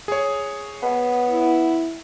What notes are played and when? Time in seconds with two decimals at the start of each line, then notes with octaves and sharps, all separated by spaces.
0.08 G#4 C#5
0.83 B3
1.30 E4